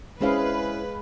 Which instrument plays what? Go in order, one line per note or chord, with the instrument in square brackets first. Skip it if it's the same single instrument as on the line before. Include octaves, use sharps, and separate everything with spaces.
[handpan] G#3 G#4 F5 [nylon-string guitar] C4 C#4 E4 [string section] B4